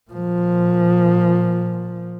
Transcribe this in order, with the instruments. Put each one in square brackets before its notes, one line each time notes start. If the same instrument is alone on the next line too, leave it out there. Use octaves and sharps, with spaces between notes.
[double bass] A#2 F3